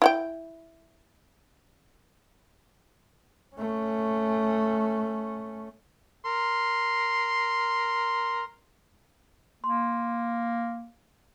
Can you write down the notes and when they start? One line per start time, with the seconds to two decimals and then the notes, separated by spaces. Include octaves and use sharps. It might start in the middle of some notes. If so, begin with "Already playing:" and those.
0.02 E4 F#5 G5
3.56 A3 C#4
6.25 A#4 C6
9.64 A#3 C6